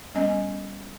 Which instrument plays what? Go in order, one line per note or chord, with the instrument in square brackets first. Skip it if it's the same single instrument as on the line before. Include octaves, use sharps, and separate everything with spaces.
[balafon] G3 B3 C#4 D#5 G#5